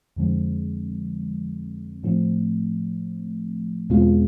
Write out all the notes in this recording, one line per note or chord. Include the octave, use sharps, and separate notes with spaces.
F2 D3 F3 G#3 C4
A2 F3 A3 C4
E2 B2 G#3 C4 F4